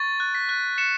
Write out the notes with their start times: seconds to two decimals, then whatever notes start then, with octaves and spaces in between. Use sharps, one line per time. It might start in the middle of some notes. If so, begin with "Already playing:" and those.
Already playing: C#6 A6
0.20 F#6
0.35 B6
0.49 F#6
0.78 F#6 C#7 E7